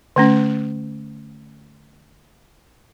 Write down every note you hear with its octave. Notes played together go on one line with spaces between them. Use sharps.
D3 A3 C#4